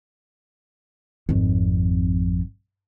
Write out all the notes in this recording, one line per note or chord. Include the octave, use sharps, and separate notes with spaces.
G#1 F2